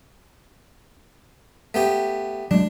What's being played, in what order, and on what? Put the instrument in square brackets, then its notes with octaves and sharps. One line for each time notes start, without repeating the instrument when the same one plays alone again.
[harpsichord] A3 B3 G4
[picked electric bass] F#3 G#3 [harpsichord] D4